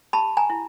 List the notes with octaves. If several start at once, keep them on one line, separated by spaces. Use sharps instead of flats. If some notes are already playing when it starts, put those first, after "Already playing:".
G4 A5 B5
G#5 A#5
E4